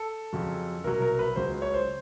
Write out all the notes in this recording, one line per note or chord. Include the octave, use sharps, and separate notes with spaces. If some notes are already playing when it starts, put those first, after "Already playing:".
Already playing: A4
F2 C#3 F#3
C2 B2 F#3 A#4
A#4
B4
C#2 C#3 F#3 C5
C#5
C5